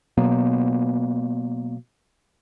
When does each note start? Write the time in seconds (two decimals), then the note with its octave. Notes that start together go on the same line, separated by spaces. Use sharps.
0.18 B2 F#3 A#3 B3